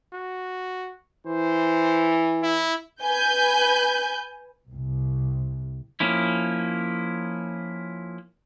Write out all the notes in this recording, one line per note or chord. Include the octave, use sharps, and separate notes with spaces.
F#4
E3 C5
E4
B4 G#5 G6
C2
F3 A#3 C#4 E4